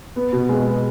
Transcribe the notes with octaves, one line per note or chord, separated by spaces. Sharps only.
B3
B2
G#3
B3